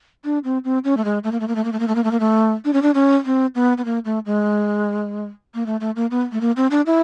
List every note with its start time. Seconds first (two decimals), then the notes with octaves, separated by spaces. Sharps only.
0.25 D4
0.44 C4
0.64 C4
0.84 C#4
0.97 A3
1.05 G#3
1.24 A3
1.32 A#3
1.40 A3
1.48 A#3
1.55 A3
1.65 A#3
1.72 A3
1.80 A#3
1.88 A3
1.95 A#3
2.04 A3
2.11 A#3
2.20 A3
2.65 D4
2.73 C#4
2.82 D4
2.94 C#4
3.25 C4
3.55 B3
3.78 B3
3.85 A#3
4.05 A3
4.26 G#3
5.54 A#3
5.66 A3
5.80 A3
5.96 A#3
6.11 B3
6.32 A3
6.41 A#3
6.57 C4
6.71 D4
6.86 E4